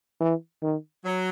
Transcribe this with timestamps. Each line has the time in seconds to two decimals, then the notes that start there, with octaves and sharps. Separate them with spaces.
0.21 E3
0.63 D#3
1.05 F#3